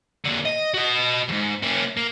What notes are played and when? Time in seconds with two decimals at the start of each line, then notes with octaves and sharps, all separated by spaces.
0.25 A#2 D3
0.45 D#5
0.74 F#4 D#5
1.29 D#2 G#2
1.63 A#3 C#4
1.97 A#3